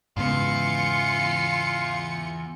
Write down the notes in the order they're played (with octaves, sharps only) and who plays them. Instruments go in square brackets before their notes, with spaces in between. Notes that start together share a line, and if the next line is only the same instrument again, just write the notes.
[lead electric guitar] E2 [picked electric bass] G#2 C#3 B3 [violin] F4 C#7 [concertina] F5